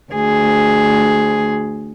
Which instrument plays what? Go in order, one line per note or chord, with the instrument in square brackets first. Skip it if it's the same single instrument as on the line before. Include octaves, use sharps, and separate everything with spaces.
[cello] D2 G#4